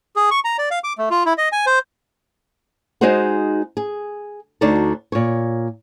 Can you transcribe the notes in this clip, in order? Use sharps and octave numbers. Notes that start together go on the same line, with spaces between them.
G#4
C#6
A#5
D5
F5
D6
A3
F4
E4
D#5
G#5
C5
G#3 D#4 F#4 G#4 C5 F#5
G#4
D2 D4 D#4 F#4 D5
A#2 C#5